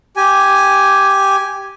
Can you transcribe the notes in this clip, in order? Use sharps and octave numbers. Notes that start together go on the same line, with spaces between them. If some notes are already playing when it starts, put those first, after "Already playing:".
G4 G#5